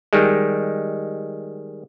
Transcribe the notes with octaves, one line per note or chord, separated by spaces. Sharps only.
D#3 G3 G#3